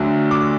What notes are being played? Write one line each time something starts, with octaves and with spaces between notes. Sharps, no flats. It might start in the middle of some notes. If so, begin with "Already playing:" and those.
Already playing: D2 D3 F#3 A3
D6